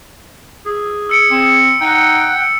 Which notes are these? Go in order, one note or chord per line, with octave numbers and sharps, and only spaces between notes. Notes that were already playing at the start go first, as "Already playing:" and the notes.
G#4
E6 C#7 D7
C4
D#4 F#5 G5